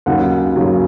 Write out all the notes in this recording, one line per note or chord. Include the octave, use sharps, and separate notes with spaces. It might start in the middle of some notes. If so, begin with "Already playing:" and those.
D#2 C#3 F#3 F#5
D#2 C#3 F#3